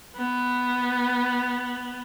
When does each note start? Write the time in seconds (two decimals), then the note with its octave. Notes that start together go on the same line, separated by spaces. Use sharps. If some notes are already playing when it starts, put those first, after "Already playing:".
0.17 B3